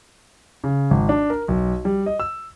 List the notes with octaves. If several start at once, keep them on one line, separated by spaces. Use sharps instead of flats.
C#3
G#1
D4
A#4
B1
G3
D#5
E6